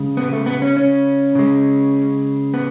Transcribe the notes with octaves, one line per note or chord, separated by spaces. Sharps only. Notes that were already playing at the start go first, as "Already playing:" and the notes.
Already playing: C#3 G#3
B3
A3
B3
C#4
C#4
C#3 G#3
B3